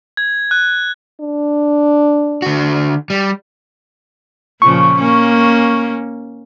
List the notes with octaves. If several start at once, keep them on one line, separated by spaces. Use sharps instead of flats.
G#6
F#6
D4
D3 F#4
G3
A#2 C#3 F3 C#6
A#3 C#4